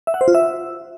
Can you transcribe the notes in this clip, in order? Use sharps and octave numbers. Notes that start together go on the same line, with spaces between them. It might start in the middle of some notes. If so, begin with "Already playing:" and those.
E5
F#5
C5
F4
E5